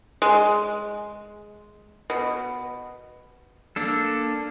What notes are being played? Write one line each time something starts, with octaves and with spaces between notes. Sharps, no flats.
G#3
B2
A#3 D4 A4